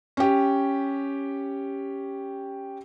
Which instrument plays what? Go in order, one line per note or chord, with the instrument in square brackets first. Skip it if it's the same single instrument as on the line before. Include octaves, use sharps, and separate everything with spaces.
[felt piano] C#4 G4